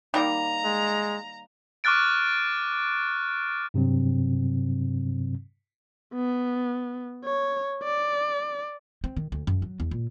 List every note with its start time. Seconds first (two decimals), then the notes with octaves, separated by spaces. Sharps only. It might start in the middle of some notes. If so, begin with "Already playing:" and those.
0.14 D#3 G3 A#3 A#5
0.65 G#3
1.84 C#6 D6 F6 F#6 A6 D7
3.74 G2 C3 F#3 C4
6.14 B3
7.25 C#5
7.84 D5
9.04 C4
9.17 D#3
9.32 D2
9.47 F#2
9.62 F#3
9.80 E2
9.91 A#2